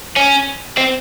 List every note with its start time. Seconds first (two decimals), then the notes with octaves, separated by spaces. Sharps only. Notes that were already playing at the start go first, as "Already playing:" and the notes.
0.17 C#4
0.78 C4